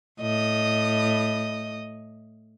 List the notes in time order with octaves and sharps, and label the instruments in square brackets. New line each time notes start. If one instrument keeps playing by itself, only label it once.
[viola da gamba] A2 D#5